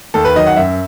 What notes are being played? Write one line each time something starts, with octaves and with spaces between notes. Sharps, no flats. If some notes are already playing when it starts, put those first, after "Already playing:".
D#2 A4
B4
D#3 F#3 D#5
F#5
F#2 E5